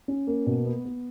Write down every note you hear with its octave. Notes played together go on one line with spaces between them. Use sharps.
C#4
A#3
B2
B3
B3